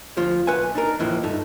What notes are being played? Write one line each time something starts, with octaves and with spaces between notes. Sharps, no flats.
D2 F3 F4
B1 B4 E5 F#5 G#5
D4 D#4 A#4
D#2 A2 E3 F3
G2 A3 D#4